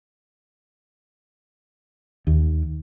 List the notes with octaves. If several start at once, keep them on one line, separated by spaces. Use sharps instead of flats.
D#2